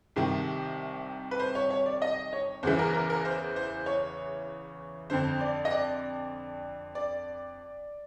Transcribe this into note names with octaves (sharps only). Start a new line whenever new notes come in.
C2 C3 D#3
B4
C5
C#5
C#5
D5
D#5
C#5
E2 C#3 E3 C5
A#4
A#4
A#4
C5
C5
C#5
F2 D3 C5
D5
D#5
D5
D5